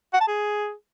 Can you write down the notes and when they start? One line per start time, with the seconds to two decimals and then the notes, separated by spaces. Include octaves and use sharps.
0.14 F#5
0.21 A5
0.28 G#4